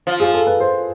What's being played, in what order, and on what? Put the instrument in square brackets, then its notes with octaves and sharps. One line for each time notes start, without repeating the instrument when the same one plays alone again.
[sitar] F3
[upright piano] G#4
A4
B4
C5